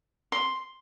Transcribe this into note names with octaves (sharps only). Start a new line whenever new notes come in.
C6